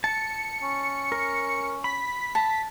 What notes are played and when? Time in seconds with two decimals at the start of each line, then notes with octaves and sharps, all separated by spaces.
0.04 A5 C#7
0.62 C#4
1.12 A#4
1.84 B5 B6
2.35 A5